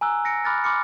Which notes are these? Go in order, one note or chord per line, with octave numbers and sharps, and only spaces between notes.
G#5 A#5 E6 F#6
A#6 C#7 D7
B5 D6 F6 F#6 A6 A#6
B5 C6 D6 F6 C#7